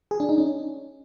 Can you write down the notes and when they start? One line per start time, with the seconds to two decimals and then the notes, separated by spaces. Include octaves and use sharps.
0.11 G#4
0.20 D4
0.29 D#4
0.38 C#4